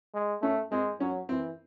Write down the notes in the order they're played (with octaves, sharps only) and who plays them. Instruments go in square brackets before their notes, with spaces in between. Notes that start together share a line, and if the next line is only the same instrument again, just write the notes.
[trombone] G#3
[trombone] A3 [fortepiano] C#4
[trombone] G#3 [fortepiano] C4
[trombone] F#3 [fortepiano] C#4
[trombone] E3 [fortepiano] C4